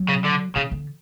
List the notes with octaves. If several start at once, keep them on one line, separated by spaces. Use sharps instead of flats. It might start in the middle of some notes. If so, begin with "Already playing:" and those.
Already playing: F#3
C#3
D3
C#3 E3
D3